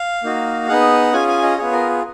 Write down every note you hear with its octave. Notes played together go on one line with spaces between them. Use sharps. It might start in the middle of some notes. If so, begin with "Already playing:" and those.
Already playing: F5
A#3 D#4 F#4
B3 D#4 G#4 F#5
C#4 F4 G#4 G#5
G#5
D#5
B3 F4 G#4 C#5
A#4